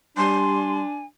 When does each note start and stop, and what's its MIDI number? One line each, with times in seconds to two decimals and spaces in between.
0.17 0.84 55
0.17 1.05 62
0.17 1.05 80
0.17 0.76 84